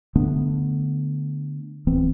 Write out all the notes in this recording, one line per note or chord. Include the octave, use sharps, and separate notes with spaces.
D3 A3 B3 D4
D1 E3 B3 C4